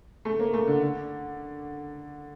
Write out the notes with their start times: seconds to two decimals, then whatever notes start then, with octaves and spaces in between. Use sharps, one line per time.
0.25 A3
0.40 A#3
0.54 A3
0.67 D3
0.82 D3